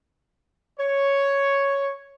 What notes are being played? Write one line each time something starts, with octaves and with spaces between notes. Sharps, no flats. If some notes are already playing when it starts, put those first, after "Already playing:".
C#5